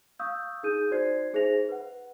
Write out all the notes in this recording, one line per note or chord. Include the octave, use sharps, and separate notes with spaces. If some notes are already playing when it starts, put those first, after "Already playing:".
F5 C#6 D#6 E6 G6
D#4 G#4 D#6 G6 D#7
D#4 F#4 C5 D5 G#6 C7
D#4 G#4 C5 E5 A#6 F7
B4 F#5